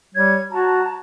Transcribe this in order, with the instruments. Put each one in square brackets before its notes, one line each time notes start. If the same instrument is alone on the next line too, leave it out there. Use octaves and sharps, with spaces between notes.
[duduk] G3 [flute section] C#5 G#6
[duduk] F#4 [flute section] A5 A#5